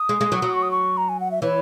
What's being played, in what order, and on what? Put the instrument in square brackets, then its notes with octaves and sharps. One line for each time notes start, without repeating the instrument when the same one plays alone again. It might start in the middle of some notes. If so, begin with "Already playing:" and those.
Already playing: [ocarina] D#6
[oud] G#3
G#3
F#3
F#3
[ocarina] C#6
D#6
C#6
A#5
G#5
F#5
E5
[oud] E3 [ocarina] C#5